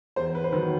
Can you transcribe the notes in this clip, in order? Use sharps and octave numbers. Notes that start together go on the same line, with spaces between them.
E2 C5
B4
C5
D#3 F#3 B4